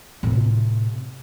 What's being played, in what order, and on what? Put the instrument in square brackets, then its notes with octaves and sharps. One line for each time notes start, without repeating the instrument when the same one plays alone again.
[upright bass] A2 C3